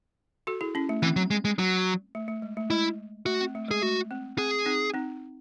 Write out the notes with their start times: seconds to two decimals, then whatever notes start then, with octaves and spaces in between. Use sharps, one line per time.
0.47 F#4 A4
0.61 E4 G#4
0.75 C#4 E4
0.89 A3
1.02 E3 C4
1.16 F#3
1.31 G#3
1.45 G#3
1.59 F#3
2.15 A3
2.28 A3
2.42 G#3
2.57 A3
2.70 G#3 E4
3.26 A3 F#4
3.41 C4
3.55 A3
3.68 G#3
3.71 G#4
3.82 A3 F#4
4.11 C4
4.38 C4 G#4
4.66 C4 D#4
4.94 C4 D#4